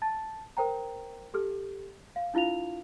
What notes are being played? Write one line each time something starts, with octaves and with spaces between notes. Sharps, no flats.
A5 A6
A#4 C5 G5 A#5
G4 A4 F6
F5
D4 E4 F4 F5 F7